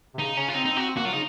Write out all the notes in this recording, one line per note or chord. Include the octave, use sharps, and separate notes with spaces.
C3
C#3 D#4
C#3 C#4
F4
C4 D#4
D#4
C4
F#4
C4
A#3 F#4
F#3 F4
C#3 D#4